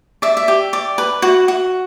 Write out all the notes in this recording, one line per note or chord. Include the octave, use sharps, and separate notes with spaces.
D5 E5
E5
G4
D5
B4
F#4
F#4